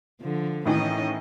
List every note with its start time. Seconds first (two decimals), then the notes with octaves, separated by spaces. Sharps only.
0.21 D3 F3
0.66 A2 D#3 E3 C#4 D#5